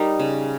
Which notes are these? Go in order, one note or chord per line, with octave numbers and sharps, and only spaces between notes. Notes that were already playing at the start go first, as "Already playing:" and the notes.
Already playing: G3 D#4 A#4
C#3